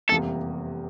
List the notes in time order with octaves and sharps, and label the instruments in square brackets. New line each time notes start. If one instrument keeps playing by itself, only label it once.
[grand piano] F1 E2 C3 G3 A#3 [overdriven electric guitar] A4